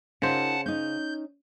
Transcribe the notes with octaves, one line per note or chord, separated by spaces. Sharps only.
C#3 D#4 F4 A#4 C5 F#5 A5
C#4 D#4 G6